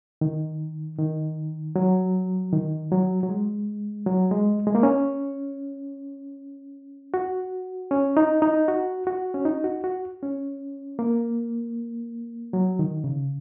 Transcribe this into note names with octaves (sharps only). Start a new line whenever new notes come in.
D#3
D#3
F#3
D#3
F#3
F#3
G#3
F#3
G#3
G#3
A#3
C#4
F#4
C#4
D#4
D#4
F#4
F#4
C#4
D#4
F#4
F#4
C#4
A#3
F#3
D#3
C#3